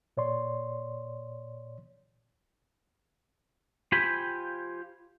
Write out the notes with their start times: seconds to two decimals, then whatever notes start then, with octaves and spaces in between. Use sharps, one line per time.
0.17 A#2 C#5 D5 C6
3.92 F4 G4 C5 G5 G#5 B5